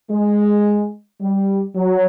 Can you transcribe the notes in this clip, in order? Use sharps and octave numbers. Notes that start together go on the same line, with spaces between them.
G#3
G3
F#3